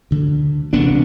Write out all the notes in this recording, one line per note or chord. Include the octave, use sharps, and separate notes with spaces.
D2 D3
E1 D2 C3 B3 D4